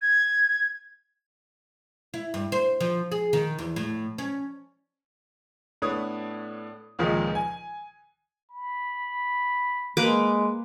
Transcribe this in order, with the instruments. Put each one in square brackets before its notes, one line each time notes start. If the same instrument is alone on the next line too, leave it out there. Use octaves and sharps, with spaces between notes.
[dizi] G#6
[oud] E4
G2
C5
F3
G#4
D#3
E2
A2
C#4
[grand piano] A2 A3 B3 D4 C#5 D#6
C#2 A#2 D#3 F3 G#3
G#5
[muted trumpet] B5
[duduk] G#3 [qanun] A#3 B4 D6